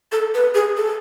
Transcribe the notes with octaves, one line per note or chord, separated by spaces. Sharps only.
A4
B4
G#4
A4